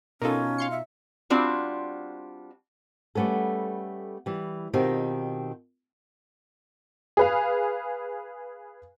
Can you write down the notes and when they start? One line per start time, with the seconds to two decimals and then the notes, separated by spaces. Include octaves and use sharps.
0.22 B2 C#4 D#4 F4 A4 A#4
0.58 F5 C6 C#7
0.71 E5
1.30 G3 C4 D4 F4 F#4
3.15 G3 A3 B3 C#4 A4
4.26 E3 G3
4.73 B2 D#3 C4 D#4 F4 G4
7.17 G#4 B4 F5